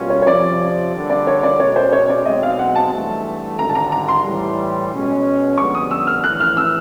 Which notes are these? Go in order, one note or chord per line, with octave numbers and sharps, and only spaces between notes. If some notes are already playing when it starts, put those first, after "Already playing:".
Already playing: B2 G3 A#3 C#4 F4
C#5
C#5
F2 C3 F3 D5
D3 G3 A#3
D5
C#5
D5
B2 G#3 C#4 C#5
C5
C#5
D5
B1 B2 G#3 C4 D#5
F5
F#5
A5
G2 E3 A3
G#1 G2 D3 A#5
A5
A#5
A#5
C6
A2 E3 G3
B2 G#3 C#4
F2 D3 G3 B3 C#6
D#6
E6
F6
A#1 A2 E3 F#6
F6
E6